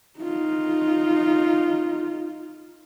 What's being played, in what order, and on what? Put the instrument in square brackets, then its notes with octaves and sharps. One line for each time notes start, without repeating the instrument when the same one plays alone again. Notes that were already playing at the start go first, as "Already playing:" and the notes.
[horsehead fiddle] D#4 F4